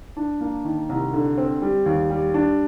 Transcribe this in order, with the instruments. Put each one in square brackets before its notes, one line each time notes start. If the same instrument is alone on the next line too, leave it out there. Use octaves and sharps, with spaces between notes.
[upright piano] D4
A#3
D#3
C2
D3
C4
G3
D#2
G3
D4